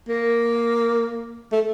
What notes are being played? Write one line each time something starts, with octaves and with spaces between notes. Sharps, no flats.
A#3
A3